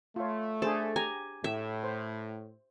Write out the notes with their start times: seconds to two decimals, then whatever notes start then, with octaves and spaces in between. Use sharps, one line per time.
0.16 A3 F4 C#5
0.62 D4 G#4 A4 C5
0.96 G4 G#5 A#5
1.44 A2 E5
1.84 C5